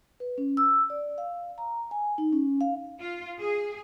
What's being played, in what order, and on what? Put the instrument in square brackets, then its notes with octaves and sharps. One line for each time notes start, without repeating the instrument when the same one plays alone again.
[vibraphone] B4
C#4
E6
D5
F5
A#5
G#5
D#4
C#4
F5
[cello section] F4
G#4